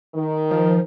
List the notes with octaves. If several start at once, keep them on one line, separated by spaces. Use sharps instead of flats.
D#3
F3